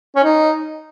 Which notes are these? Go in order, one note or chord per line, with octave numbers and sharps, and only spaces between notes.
C#4
D#4